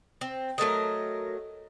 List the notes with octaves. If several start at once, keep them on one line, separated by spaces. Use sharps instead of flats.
C4
F#3 A3 A#4 D#5